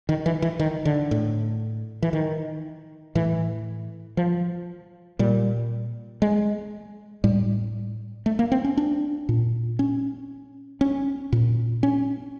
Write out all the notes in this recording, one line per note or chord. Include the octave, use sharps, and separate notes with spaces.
D#3
E3
E3
D#3
D3
A2
E3
D#3
A2 E3
F3
A#2 G3
G#3
A2 G3
A3
A#3
C4
C#4
D4
A#2
C#4
C#4
A#2
C#4